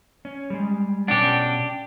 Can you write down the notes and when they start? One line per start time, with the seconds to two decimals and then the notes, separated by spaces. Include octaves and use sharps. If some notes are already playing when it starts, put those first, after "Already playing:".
0.25 C#4
0.50 G3 G#3
1.08 B2 C#4 D4 G4 F#5